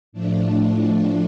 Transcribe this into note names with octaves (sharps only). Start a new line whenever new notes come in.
A2 F3 A3 D4
D4